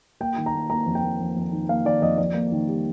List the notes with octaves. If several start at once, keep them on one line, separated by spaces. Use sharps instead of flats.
A#3 G5
D#3
A#5
A#3
A#3 A#5
F2
G5
A#3
F2
F2
D#3
A#3 F5
D#3 D5
F2 D#5
F2 D5
A#3
D#3
G3